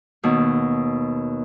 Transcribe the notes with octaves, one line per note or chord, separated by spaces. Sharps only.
D#2 B2